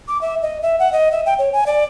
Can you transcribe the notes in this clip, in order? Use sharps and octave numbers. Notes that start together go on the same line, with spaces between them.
D6
E5
D#5
E5
F#5
D#5
E5
G5
C#5
G#5
D5